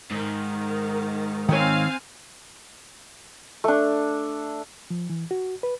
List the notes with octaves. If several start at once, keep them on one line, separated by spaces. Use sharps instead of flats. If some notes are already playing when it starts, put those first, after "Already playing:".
G#2 D#3
D#3 C4 C#5 F5 G#5
A3 D4
F3
E3
F#4
B4